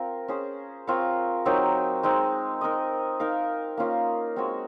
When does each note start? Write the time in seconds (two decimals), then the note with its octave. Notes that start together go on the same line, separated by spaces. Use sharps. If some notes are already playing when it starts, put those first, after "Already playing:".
Already playing: C4 F4 A#4
0.28 C#4 G#4 C5
0.87 C4 F4 A#4 C#5
1.45 F#3 C4 D#4 A#4
2.03 G#3 C4 D#4
2.61 D#4 A#4 D#5
3.20 D#4 A#4 F5
3.77 A#3 C#4 F4 A#4
4.36 G#3 C4 F#4 C#5